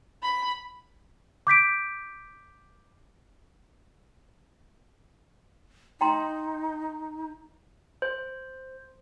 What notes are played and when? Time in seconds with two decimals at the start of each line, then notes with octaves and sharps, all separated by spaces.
0.22 B5
1.47 D6 G6 B6 D7
6.01 D#4 G5 A#5 C6
8.02 C5